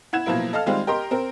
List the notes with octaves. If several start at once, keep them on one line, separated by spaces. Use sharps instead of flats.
E4 F#5 G#6 E7
B2 F3 F#3 A#3 E4
A4 D#5 F5 A5 F6
D#3 G3 G#3 C4 F4
G4 A#4 D#5 A#5 C6
C4 A#4